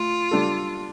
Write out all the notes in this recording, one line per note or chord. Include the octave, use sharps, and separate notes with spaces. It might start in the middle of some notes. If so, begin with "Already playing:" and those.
Already playing: A3 F4
G3 D4 A4